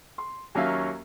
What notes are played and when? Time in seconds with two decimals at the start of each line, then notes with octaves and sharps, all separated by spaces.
0.18 C6
0.55 D#2 F#3 A#3 C#4 E5 F5